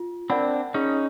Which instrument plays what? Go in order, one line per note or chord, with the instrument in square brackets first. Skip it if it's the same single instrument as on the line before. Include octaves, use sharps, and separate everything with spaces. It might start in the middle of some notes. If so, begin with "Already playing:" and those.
Already playing: [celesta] F4
[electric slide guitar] C4 D4 [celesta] A#4 D5 F#5 B5
[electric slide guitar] C#4 D#4 [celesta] G#4